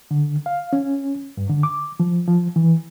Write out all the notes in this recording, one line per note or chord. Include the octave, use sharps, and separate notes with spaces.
D3
F5
C#4
G2
D3
D6
F3
F3
E3